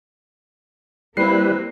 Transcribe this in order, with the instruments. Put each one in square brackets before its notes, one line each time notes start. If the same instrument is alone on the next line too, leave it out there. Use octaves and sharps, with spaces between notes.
[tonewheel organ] G3 B4 [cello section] A#3 [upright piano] C4 C7 [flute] E4